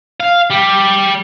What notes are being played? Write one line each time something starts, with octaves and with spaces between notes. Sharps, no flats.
F5
G3